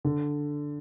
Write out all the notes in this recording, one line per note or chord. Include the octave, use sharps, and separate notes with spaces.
D3